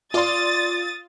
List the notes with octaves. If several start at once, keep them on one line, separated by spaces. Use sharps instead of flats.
F4 D5 C6 D#6 A6